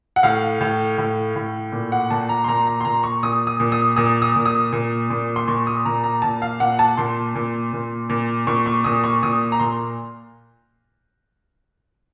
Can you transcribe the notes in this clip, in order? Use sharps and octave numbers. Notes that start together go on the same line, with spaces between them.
F#5
A2 F5
A2
A2
A2
A#2
F#5
A#2 A5
A#5
C6
A#2 A#5
A#5
C6
A#2 A#5
C#6
A#2 D#6
D#6
A#2
D#6
A#2 D#6
D#6
A#2
D#6
A#2
A#2
C6
A#2 C#6
D#6
A#2 A#5
A#5
A#2 A5
F5
A#2 F#5
A5
A#2 C6
A#2
A#2
A#2
A#2 C#6
C#6
A#2 D#6
C#6
A#2 D#6
A#5
A#2 C6